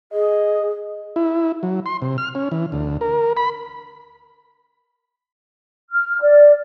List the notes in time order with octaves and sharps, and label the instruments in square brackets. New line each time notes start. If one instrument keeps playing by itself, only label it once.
[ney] G#4 [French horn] D#5
[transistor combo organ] E4
F#3
C6
C3
F6
C#4
E3
D2
A#4
B5
[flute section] F6
D5